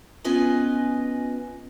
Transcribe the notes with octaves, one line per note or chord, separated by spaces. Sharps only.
B3 C#4 F4 B4 D#5 G#5